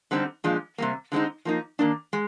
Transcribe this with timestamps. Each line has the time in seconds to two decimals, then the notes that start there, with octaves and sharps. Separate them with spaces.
0.11 D3 G3 C4 D#4
0.44 A#2 F3 G#3 D4
0.78 C3 G3 A#3
1.12 D3 G#3 C4 D#4
1.45 F3 A#3 D#4
1.79 D#3 A#3 D4
2.13 G#3